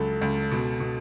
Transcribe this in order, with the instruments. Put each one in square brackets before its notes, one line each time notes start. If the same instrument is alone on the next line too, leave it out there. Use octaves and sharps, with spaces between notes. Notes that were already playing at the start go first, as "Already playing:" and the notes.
Already playing: [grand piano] C#2 F#3 [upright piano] A4
[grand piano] C#2
B2
B2